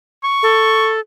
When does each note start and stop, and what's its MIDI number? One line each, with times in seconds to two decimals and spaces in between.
0.24 0.91 85
0.43 1.00 69